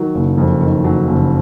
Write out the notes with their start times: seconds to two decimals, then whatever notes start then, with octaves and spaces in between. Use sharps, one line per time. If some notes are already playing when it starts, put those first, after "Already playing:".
Already playing: D#3 F#3
0.15 F#1
0.38 F2
0.61 D#3
0.84 F#3
1.08 F#1